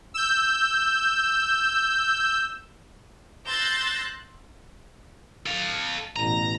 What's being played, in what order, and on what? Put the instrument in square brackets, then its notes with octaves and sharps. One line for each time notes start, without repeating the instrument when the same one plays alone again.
[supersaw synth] E6 G6
[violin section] C6 E6 F#6 G6 A6 A#6
[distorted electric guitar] A4 F5
[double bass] A1 B2 [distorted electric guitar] A#5